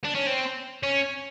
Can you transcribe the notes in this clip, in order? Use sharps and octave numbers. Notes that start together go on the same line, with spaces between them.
D4
C#4
C4
C#4